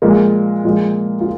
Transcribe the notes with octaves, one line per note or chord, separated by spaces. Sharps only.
A#2 F3 G#3 A#3
A#2 F3 G#3
F4